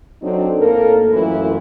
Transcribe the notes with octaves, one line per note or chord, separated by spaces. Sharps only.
F#3 C4 D4 D#4 A4
A2 A#3 A4 A#4
F#2 E3 A3 E4 F4